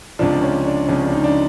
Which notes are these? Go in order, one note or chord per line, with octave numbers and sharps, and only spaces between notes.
C#2 C3 F3 D4
C#4
D4
C#2 C3 F3 C#4
D4
D#4
D4